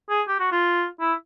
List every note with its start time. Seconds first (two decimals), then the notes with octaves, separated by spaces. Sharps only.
0.09 G#4
0.28 G4
0.39 F#4
0.52 F4
1.00 E4